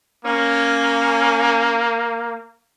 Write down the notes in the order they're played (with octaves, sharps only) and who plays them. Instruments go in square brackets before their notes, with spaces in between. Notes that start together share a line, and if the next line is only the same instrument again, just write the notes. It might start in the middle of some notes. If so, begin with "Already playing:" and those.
[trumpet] A#3 [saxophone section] C#4